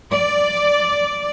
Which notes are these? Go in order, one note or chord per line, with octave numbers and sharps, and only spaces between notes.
D5